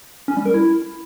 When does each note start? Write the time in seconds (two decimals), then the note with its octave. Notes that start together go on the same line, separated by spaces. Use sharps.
0.28 C#4
0.37 G3
0.46 A#4
0.54 E4